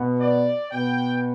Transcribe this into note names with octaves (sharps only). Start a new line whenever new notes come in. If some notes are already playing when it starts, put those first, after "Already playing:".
Already playing: B2 B3
D5
B2 B3 G5